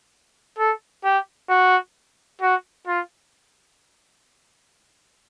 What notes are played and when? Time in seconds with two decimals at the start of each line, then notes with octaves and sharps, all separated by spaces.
0.58 A4
1.04 G4
1.49 F#4
2.42 F#4
2.87 F4